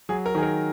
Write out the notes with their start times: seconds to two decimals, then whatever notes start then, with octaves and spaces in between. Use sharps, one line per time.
0.09 F#3 G#4
0.26 A#4
0.35 D#3 G#4
0.43 A#4